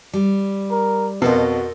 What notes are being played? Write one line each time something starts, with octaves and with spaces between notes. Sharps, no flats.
G3
A#4
F2 B2 F#4 A4 A#4 D#5